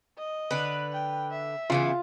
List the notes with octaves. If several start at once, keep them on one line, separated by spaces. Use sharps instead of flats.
D#5
D3 B4
G5
E5
C#3 E3 B3 F4